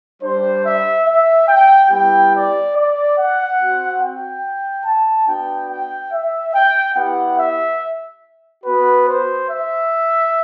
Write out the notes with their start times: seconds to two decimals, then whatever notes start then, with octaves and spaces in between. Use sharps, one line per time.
0.22 G3 D4 G4 C5
0.64 E5
1.07 E5
1.48 G5
1.91 G3 B3 E4 G4 G5
2.33 D5
2.75 D5
3.17 F#5
3.59 C4 F#4
4.01 G5
4.85 A5
5.27 B3 D4 F#4 G5
5.70 G5
6.12 E5
6.54 G5
6.96 B3 E4 G4 F#5
7.37 E5
8.64 B3 F#4 B4
9.06 C5
9.48 E5